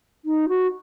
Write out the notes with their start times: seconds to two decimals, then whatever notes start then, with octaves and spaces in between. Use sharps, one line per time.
0.25 D#4
0.49 F#4